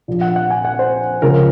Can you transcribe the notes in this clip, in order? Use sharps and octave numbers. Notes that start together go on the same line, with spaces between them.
A#1 A#2 F3
F#5
F#5
G#5
F#5
C5
C#2 C#3 F3 A#4